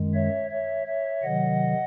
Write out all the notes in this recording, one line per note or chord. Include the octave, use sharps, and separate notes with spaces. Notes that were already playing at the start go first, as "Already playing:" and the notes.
Already playing: F#2 D#3 G#3
C#5 E5
C#5 E5
C#5 E5
C3 D#3 F#3 D#5 F#5